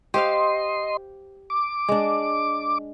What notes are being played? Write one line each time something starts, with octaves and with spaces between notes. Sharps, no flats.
G4 C5 D#5 F5 C6
D6
G#3 D4